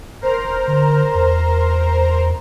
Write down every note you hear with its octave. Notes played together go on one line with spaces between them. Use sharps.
E1 A#4 C5 A#5
D3
E2